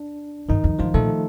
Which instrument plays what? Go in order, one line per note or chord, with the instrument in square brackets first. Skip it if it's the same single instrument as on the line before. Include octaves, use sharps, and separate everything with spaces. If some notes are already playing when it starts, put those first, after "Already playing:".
Already playing: [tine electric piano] D4
[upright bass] G2 [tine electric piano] D#3 D#4
[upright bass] F2
[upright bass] G2 [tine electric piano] F3 F4
[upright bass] A#2 [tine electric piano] A3 A4